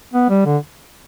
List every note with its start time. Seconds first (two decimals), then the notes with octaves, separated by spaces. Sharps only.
0.14 B3
0.29 G3
0.46 D3